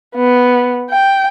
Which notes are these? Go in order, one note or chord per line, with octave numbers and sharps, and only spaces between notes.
B3
G5